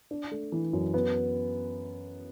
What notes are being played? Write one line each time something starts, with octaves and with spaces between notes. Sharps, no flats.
D4
A3
E3
F#2
B3